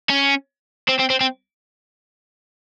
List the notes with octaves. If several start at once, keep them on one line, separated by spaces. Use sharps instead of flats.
C#4
C4
C4
C4
C4